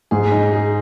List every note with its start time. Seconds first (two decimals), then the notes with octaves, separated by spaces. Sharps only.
0.11 G#2 G#4
0.32 D#4
0.53 G#4